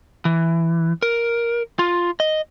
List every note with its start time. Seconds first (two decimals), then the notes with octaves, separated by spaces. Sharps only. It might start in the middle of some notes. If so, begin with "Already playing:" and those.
0.25 E3
1.03 A#4
1.79 F4
2.20 D#5